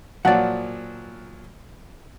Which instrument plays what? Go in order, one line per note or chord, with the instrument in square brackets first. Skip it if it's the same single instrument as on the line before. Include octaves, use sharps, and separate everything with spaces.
[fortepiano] A#2 F3 F#3 [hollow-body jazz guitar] D5 F#5